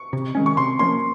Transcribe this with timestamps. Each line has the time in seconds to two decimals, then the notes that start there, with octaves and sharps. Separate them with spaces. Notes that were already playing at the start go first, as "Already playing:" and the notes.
Already playing: C#6
0.13 C3
0.35 D#3 G#3 C#4
0.46 C#6
0.57 C3 C6
0.79 F3 A#3 C#4 C6